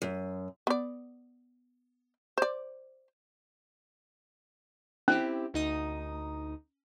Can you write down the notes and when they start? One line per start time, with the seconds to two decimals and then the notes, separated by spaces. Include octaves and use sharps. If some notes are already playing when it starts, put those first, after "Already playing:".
0.02 F#2
0.67 B3 D5
2.38 C5 D5
5.08 C4 C#4 E4 G4
5.54 D2 D#4 D#6